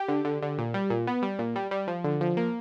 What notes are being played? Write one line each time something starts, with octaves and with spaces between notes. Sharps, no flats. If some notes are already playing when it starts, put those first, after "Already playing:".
Already playing: G4
D3
D3
D3
A#2
G3
A#2
B3
G3
A#2
G3
G3
F3
D3
F3
A#3